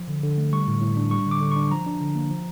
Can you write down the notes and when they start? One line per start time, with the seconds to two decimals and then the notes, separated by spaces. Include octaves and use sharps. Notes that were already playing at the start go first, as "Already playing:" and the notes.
Already playing: F3
0.08 D3
0.23 D3
0.38 A3
0.53 G3 C#6
0.68 A2
0.81 A2
0.97 D4
1.11 G3 C#6
1.27 D3 D6
1.41 D3
1.52 D4 C#6
1.71 F3 A#5
1.86 D4
2.00 D3
2.15 A#3
2.30 F3